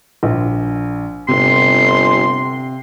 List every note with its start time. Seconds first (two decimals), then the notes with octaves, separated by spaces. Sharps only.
0.23 A#1
1.28 G1 C3 C6